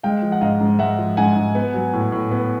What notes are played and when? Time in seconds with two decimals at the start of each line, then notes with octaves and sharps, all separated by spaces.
0.03 G#3 F5 G5
0.22 F3
0.32 F#5
0.41 G#2 D#5 F5
0.60 G#2
0.79 G#3 E5 F#5
0.98 F3
1.17 G#2 F#5 G#5
1.36 G#2
1.55 B3
1.74 F#3
1.93 A2
2.12 A2
2.31 B3